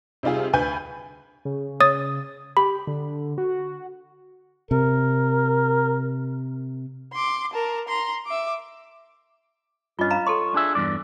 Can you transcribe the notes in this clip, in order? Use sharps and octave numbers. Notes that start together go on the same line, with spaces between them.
C3 G3 D#4 F4 G#4
D2 B4 G#5 B5 G6
C#3
C#5 D#6 A6
G4 B5
D3
F#4
C3 A#4
C6 D6
A#4 A5
A#5 C6
E5 D6
G2 C#4 F4 D#5
F5 A#5 B5
A4 C#5 C6
D4 G#4 E5
E2 G2 D5